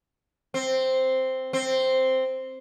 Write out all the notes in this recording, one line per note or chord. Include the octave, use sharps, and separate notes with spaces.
C4
C4